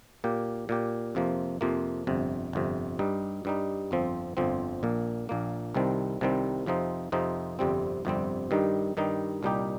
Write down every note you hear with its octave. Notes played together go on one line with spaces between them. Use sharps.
A#2 A#3 G4
A#2 A#3 G4
F2 C3 F3 A#3
F2 C3 F3 A#3
G1 F2 C3
G1 F2 C3
G2 G3 D#4
G2 G3 D#4
G1 F2 F3 C4
G1 F2 F3 C4
A#1 A#2 A#3
A#1 A#2 A#3
C2 C3 D#3 G3 C4
C2 C3 D#3 G3 C4
F2 C3 F3 C4 D#4
F2 C3 F3 C4 D#4
G1 F2 C3 G3 C4
G1 F2 C3 G3 C4
G2 D#3 G3 D#4
G2 D#3 G3 D#4
C2 A#2 G3 D#4 G4